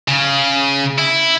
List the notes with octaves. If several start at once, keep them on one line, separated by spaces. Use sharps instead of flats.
C#3
E4